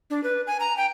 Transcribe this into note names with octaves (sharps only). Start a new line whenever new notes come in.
D4
B4
G#5
A#5
G5